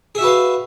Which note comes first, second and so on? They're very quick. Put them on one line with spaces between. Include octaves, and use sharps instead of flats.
G#4 E5 F#4 B4 F5